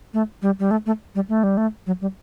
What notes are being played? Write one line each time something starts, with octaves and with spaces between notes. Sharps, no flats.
A3
G3
G3
A3
A3
G3
A3
G3
A3
F#3
G3